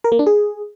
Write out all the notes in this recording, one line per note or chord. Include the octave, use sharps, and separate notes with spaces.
A#4
A#3
D4
G#4